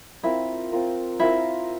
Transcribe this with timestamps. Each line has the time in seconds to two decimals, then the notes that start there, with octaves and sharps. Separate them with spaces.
0.23 C4 E4 F4 A#4
0.72 C4 F4 A#4
1.20 C4 E4 F4 A#4